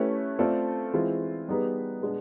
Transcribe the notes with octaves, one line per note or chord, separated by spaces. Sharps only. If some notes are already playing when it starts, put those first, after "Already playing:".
Already playing: A3 C#4 E4 G4 B4
A3 C4 F4 A4 D5
E3 G#3 C4 F4
G3 B3 D#4 G#4 B4
B2 G#3 B3 D4